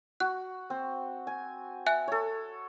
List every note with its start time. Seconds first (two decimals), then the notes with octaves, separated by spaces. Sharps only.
0.20 F#4 F#6
0.70 C4
1.27 G#5
1.86 E5 G#5 F#6
2.08 A4 C#5